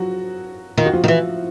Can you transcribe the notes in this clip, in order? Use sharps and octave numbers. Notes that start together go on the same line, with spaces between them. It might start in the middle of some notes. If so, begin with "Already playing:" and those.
Already playing: F3 F#3 F#4
D#3 F4
F#4
F3 F4
D#3
E3